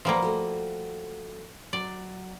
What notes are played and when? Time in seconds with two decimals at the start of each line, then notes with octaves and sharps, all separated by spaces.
0.05 F3 G3 A#3 B4 F#5
0.22 A3 F#4
1.73 F#3 D5